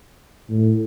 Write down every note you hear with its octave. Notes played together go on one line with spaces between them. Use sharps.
A2